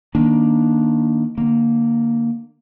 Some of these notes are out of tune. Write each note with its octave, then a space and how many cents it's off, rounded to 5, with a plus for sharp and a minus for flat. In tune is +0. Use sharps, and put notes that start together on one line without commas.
D#3 +0 A#3 +15 D4 +0
D3 +35 A#3 +0